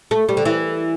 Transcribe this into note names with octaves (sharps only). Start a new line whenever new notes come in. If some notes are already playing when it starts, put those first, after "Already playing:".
A3
G3
D3
E3